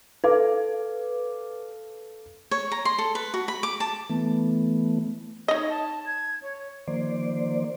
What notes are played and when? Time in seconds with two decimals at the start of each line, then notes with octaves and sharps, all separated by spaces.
0.24 A4 B4 F5 D6
2.51 C#5
2.72 A#5
2.85 C6
2.98 A4
3.15 B4
3.34 F#4
3.48 B5
3.63 D6
3.80 A5
4.09 E3 A3 B3
5.48 D#4 C#5 D#5
5.69 A5
6.06 G#6
6.42 C#5
6.88 D#3 F3 A#3 C5 D5